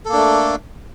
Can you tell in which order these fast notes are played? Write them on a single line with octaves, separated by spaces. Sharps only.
A4 A#3 D4 A3